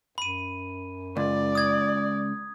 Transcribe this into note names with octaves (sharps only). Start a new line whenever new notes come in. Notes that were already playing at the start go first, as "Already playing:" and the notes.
F#2 B5 D#7
C#2 D5
D#6 G#6